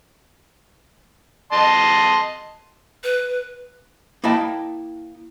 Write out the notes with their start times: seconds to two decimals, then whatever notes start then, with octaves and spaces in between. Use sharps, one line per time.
1.53 D#5 A5 C6
3.03 B4
4.24 A#3 E4 D#5 G5 A5